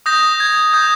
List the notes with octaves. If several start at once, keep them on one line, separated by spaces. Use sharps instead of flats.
D#6 G6 A#6
G#6
D#6 G6